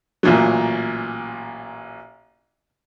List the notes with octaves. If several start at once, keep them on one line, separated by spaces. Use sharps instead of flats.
A1 A#2 F#3